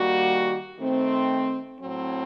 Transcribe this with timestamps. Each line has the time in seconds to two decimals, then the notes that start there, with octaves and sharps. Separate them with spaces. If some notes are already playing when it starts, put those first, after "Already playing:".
Already playing: D#3 G3 A#3 F#4
0.78 D#3 A3 C4
1.80 A2 F#3 C4